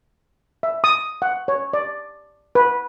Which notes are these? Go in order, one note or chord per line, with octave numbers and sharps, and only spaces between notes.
E5
D#6
F#5
C#5
D5
B4